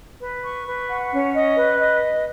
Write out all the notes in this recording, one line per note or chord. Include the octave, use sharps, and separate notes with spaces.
B4
C#6
B4
F#5
C#4
D#5
B4
D#5